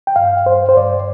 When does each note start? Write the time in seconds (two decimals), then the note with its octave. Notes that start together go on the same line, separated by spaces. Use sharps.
0.07 G5
0.16 G2 F5
0.46 G2 C5
0.69 C5
0.77 G2 D5